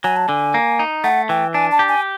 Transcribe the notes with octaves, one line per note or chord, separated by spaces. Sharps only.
F#3 G#5
A5
D3 G#5
A#3
D#4
A3 F#5
E3 G5
D4 G#5
A5
G4
G#5